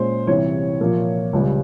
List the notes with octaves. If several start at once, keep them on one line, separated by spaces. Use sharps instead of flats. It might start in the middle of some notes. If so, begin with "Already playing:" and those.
Already playing: A#2 G#3 C#4 C5
C2 C3 E3 C#5
A#2 F3 A#3
C#2 C#3 G3